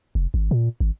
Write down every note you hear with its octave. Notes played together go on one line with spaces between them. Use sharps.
F1
G#1
A#2
G#1